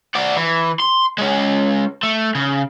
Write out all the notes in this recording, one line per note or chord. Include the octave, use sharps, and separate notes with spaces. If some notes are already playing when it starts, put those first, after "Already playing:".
F#4 D5
E3
C6
G#3 C#4
A3
C#3